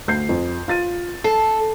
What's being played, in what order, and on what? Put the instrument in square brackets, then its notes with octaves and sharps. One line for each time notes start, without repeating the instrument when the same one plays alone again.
[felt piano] D2 G6 C7
F2
F4 A6 D#7
[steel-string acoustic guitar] A4 [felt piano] C7